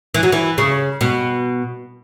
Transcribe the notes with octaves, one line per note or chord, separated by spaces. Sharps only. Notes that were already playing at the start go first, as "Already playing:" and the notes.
E3
F#3
E3
C#3
B2